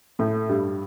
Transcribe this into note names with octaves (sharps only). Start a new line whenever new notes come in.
A2 A3
G2 G3